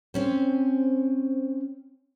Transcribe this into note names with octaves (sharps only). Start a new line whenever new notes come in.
C4 C#4 C5